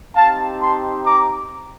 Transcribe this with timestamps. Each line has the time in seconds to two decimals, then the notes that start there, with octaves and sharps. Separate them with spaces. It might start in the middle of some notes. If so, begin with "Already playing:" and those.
0.15 C4 D#4 G4 F5 A5
0.60 A5 C6
1.05 A#5 D6